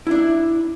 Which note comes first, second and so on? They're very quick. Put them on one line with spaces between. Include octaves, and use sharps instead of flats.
E4 D4 E5